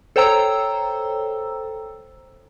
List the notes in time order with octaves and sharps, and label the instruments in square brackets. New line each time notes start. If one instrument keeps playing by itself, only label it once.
[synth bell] A4 C5 C#5 G5 A#5 E6